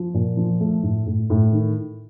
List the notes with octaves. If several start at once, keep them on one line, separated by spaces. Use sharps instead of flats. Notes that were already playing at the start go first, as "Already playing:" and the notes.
Already playing: F3
A#2
F3
A3
A2
A2
A2
D#3